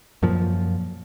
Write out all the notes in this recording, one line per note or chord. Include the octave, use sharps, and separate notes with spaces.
F#2 A#2 F3